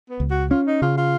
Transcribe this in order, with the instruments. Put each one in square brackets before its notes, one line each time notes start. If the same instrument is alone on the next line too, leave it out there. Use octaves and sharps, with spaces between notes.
[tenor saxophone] B3
[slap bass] C#2
[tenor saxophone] F#4
[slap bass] C#4 [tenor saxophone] F4
[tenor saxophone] D#4
[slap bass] C#3 [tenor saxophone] F4
[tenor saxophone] F4